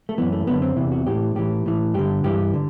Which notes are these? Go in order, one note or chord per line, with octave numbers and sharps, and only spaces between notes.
A3
F#2 E3 B3
A3
F#2 D3 B3
C4
E2 C3 E3 E4
F#4
A2 E3 G4
A2 E3 G4
A2 E3
G2 D3 G4
G2 E3 G4
D3